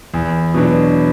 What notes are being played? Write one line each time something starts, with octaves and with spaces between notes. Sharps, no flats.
E2
B2 F#3 B3 D4